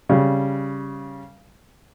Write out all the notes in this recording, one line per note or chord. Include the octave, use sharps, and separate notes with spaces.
C#3 G3